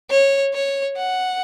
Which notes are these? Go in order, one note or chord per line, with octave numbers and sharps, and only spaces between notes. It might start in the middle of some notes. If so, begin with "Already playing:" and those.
C#5
C#5
F#5